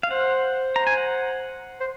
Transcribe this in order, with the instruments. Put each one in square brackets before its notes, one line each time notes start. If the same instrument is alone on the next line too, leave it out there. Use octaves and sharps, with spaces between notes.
[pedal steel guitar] F5
[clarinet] C5 [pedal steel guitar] F#5
[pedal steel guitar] A#5
G#5
F#5
[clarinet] C5